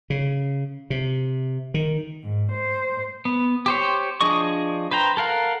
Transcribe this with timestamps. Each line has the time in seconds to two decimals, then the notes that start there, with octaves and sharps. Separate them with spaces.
0.10 C#3
0.90 C3
1.74 D#3
2.25 G#2
2.54 C5
3.25 B3
3.66 G4 C5 C#5
4.21 F3 D4 G#4 D#5 C#6
4.91 B4 C5 G5 A#5
5.17 A4 A#4 F5 F#5